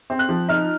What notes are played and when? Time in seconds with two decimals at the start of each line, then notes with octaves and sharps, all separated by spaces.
0.10 C4
0.19 F#6
0.29 F3
0.49 D#4 F6